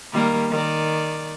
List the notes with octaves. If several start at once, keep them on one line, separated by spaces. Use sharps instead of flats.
D#3 G3 A#3
D#3 D5